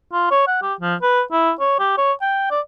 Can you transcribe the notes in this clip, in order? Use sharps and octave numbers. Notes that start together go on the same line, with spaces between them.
F4
C#5
F#5
G4
F3
B4
E4
C#5
G4
C#5
G5
D5